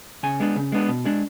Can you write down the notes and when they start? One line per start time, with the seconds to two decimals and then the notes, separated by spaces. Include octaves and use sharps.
0.23 C#3 G#5
0.40 G#3 B3 D4
0.56 C#3
0.72 G#3 B3 D4
0.89 B2
1.05 G#3 D4